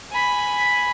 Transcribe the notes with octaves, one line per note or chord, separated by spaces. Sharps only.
G#5 B5